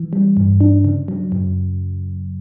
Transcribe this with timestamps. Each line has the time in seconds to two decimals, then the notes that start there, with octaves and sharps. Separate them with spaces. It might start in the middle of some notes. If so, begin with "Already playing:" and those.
Already playing: E3
0.13 G3
0.37 G2
0.61 D4
0.85 C#3
1.08 F#3
1.32 F#2